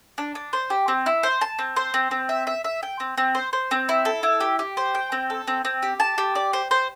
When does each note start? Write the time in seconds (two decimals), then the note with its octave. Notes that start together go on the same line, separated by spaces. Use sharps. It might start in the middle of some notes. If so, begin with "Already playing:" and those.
0.18 D4
0.35 D4
0.53 C5
0.70 G4
0.88 C4
1.06 E4
1.23 C5
1.41 A5
1.59 C4
1.76 C5
1.94 C4
2.11 C4
2.29 E5
2.47 E5
2.64 E5
2.83 G5
3.00 C4
3.18 C4
3.35 C5
3.53 C5
3.71 C4
3.89 E4
4.05 A4
4.23 E4
4.41 G4
4.59 G4
4.77 C5
4.95 G5
5.12 C4
5.30 A4
5.47 C4
5.65 C4
5.83 G4
6.00 A5
6.18 G4
6.35 D5
6.53 C5
6.71 C5